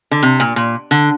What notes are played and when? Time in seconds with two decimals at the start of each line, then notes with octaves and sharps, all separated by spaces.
0.11 D3
0.23 C3
0.40 A#2
0.56 A#2
0.91 D3